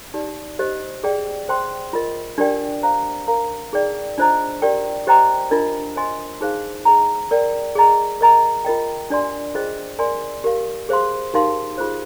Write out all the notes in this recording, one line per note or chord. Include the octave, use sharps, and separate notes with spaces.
D#4 G4 D5
G4 C5 D#5
G#4 D5 G5
C5 G5 C6
F4 A#4 D#5
D4 G4 A#4 D5 G5
C5 F5 A#5
A#4 F5 A#5
D#4 G#4 D5 G5
D4 F4 C5 D#5 A#5
G4 A#4 D5 G5
G4 C5 D#5 G5 A#5
D4 F4 A#4 D#5
C5 D#5 G#5 C6
D#4 G#4 C5 F5
G#4 D#5 A#5
A#4 D5 G5
G#4 D#5 A#5
A#4 D#5 A#5
F4 A#4 D#5 G5
D4 G4 D5 G#5 C6
F4 G#4 C5 D#5 G5
A#4 D5 G#5 C6
G4 A#4 F5
G#4 C5 F5 C6
D#4 G4 A#4 F5 C6
F4 G#4 C5